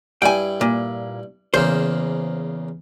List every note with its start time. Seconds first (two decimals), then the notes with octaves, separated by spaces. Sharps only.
0.22 G2 E4 G5 G#5
0.61 A#2
1.54 E2 C#3 A#3 C5